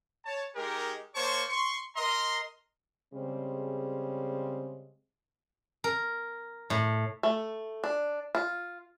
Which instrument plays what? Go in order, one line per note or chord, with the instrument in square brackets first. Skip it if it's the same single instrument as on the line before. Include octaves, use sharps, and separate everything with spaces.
[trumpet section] C#5 A5
G#3 D#4 G4 A#4
A#3 C5 C#5 A5 C#6
C6 C#6
A#4 D#5 A#5 C6
[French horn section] C#3 G3 G#3 C4
[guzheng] A#4
A2
[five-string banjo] A3
D4
F4